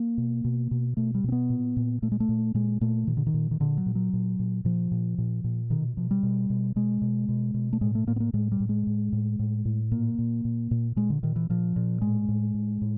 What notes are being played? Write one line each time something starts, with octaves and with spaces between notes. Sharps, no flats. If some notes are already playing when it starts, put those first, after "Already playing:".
Already playing: A#3
B2
B2
B2
B2 A3
G3
B2 C4
B3
A#2
A#2
A#2 A3
G#3
A3
A#2
A#2 G#3
A#2 A3
A#2 D#3
D3
D#3
A#2
D#3
A#2 D3
F#3
A#2
F#3
A#2
A#2
A#2 F3
A#2
A#2
A#2
B2 D#3
B2 F3
G3
B2
B2
B2 G#3
B2
B2
B2
A3
A2 G#3
A3
A2 A#3
B3
A#3
A2 G#3
G3
A2
G#3
A2
A2
A2
A2
A#2 A#3
A#2
A#2
A#2
A#2 G#3
D3
A#2 D#3
E3
A#2 F3
A#2
A2 G#3
A2
A2
A2